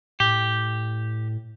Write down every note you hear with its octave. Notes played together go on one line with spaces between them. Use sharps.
A2 G4